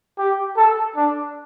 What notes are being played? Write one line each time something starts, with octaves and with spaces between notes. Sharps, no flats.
G4
A4
D4